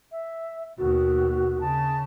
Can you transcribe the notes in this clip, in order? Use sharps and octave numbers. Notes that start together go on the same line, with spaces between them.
E5
D#2 B2 F#4
C#3 A5